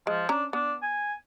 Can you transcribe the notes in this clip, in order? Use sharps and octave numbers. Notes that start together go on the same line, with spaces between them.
F3 G#3
C#4 D4 A#5
B3 D4
G#5